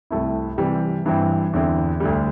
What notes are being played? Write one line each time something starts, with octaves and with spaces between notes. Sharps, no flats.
C2 C3 A3 E4
C3 E3 G3
G2 E3 C4 E4
E2 D3 C4 E4
D2 D3 G3